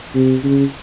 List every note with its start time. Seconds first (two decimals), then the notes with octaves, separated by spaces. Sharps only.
0.15 C3
0.44 C#3